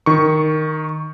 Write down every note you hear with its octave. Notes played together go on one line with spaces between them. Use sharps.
D#3 C#6